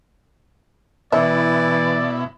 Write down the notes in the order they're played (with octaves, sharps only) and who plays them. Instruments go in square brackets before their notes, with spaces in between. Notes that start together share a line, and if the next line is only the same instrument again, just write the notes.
[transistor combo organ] B2 E4 [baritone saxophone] E3 [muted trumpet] D5 [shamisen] E5